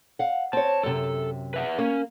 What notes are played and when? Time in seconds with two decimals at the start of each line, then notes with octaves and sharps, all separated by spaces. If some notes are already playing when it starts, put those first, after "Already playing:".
0.19 F5 F#5
0.53 C4 C#5 A5
0.83 F#2 C3 A4
1.54 B4 E5 F#5
1.79 A#3 C#4